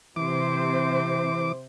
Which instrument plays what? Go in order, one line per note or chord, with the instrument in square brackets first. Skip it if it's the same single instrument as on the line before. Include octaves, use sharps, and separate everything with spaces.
[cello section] C3 C5 [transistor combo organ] E3 D6